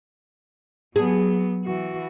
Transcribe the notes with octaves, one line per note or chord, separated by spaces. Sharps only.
F#3 B3 G#4
E3 F#4